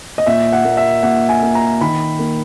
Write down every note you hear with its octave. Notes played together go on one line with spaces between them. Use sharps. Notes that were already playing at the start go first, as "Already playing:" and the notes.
D#5
A#2 E5
F#5
A#3
E5
A#2 F#5
G#5
A#3
A#5
D#3 B5
A#3